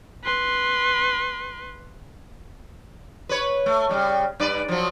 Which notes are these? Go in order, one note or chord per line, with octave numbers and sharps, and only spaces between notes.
B4 C6
B4 C#5
A3
C#3 G3
G2 B4 D5
F3 F#3